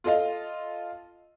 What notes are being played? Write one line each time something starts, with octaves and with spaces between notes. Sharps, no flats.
F4 A4 D#5 F5